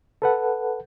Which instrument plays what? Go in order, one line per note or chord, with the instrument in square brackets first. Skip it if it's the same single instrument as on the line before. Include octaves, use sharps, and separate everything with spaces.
[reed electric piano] A4 B4 F#5